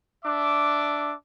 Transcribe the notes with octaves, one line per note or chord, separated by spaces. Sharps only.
D4 E5 D6